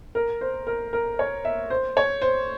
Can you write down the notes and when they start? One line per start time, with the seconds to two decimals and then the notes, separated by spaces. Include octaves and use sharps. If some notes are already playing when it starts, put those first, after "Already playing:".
0.15 A#4
0.41 C5
0.67 A#4
0.93 A#4
1.19 C#5
1.45 E5
1.70 C5
1.97 C#5
2.22 C5